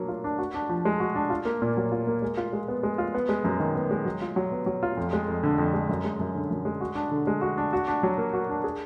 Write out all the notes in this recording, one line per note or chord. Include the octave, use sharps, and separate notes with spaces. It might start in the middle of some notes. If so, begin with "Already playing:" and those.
Already playing: F#3 A#3 D4
F4
D4
F#4
D4
F3
G#3
F#4
D4
F4
A#3
A#2
F#3
F4
A#3
G#3
F4
G#3
B3
G#3
F4
B3
G#3
F#2
D#3
B3
G#3
F#3
F4
F#3
B3
F#3
F4
F2
G#3
F2
D3
F2
G#3
F#2
G#3
F#2
D3
F#2
G#3
F#4
D4
D3
G#3
F#4
D4
F#4
D4
F#3
A#3
F#4
D4
G#4